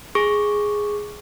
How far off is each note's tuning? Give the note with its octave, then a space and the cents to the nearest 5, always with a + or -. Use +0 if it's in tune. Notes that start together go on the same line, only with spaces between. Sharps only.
G#4 +0 C#6 +0